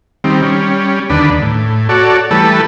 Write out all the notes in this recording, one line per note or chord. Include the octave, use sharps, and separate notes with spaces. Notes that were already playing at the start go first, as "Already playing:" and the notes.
D#3 G3 C4
G3 C#4
D#2 D3 D4 B4
A2
F#4 A4 C#5 D5
E3 G3 A3 A4 B4